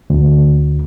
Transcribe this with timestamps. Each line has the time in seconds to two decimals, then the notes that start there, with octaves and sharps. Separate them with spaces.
0.10 D2